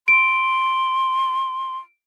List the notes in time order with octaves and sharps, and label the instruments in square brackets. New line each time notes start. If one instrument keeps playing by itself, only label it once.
[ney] C6 [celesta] D7